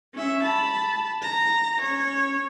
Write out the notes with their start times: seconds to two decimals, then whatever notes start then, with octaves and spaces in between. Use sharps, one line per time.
0.14 C#4 E5
0.44 A5 B5
1.22 A#5
1.82 C#4 C#5